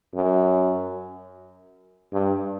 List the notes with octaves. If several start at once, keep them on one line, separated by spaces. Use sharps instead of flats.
F#2
G2